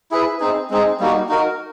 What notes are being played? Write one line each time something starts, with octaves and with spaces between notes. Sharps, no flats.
E4 G#4 B4
C4 D#4 G#4
G#3 C4 D#4 G#4
G3 A#3 D#4 F#4
D#4 F#4 A#4